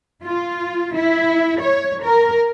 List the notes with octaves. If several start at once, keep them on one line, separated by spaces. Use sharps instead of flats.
F4
E4
C#5
A#4